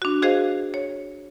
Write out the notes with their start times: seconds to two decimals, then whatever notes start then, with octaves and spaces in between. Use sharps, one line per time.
0.02 D4 F#4
0.22 F#4 G#4 C5 D#5 F5
0.74 C#5